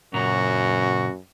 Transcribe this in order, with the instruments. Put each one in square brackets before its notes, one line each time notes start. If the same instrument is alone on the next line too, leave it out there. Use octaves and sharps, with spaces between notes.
[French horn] F#2 [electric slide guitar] A#2 C#3 A#5 [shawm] F#4